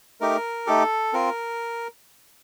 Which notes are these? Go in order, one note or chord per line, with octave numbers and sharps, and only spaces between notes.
A3 D#4 G4 A#4
A3 D#4 G4 A4
C4 F4 A#4